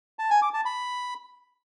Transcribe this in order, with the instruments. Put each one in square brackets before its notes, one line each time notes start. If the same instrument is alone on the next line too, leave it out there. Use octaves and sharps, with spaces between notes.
[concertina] A5
G#5
D6
A5
B5